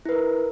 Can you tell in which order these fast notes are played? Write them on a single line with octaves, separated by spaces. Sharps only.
E4 B4 A#4